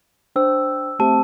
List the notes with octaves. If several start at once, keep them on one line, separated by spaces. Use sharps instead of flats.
D4 C5 G5 E6
A3 C4 G4 C5 E5 A5